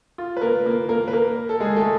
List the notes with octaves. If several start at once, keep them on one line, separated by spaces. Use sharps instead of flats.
F4
B4
A#3 A#4
A#3 A#4
A#3 A#4
B4
A#3 A#4
A4
G#3 G#4
A3 A4